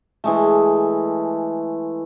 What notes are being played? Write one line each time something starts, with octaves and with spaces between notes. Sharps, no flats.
E3 G#3 A3